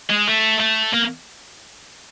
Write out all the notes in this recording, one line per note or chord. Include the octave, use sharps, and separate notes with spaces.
G#3
A3
A3
A#3